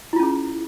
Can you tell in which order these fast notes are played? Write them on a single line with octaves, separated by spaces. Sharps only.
E4 F4 C#4 G#4